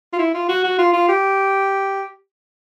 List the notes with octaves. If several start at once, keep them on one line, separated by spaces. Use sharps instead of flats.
F4
E4
F4
F#4
F#4
F4
F4
G4